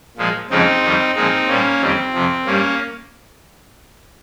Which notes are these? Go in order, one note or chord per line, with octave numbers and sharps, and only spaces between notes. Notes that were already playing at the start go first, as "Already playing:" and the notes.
A#2 F3 G#3
F2 C#3 F3 G#3 C4 D#4
F2 D#3 G3
A#2 F3 G#3 C4 D#4
A#2 G3 A#3 C#4
F2 D#3 G3 C4
F2 C3 F3
G2 G3 A#3 C#4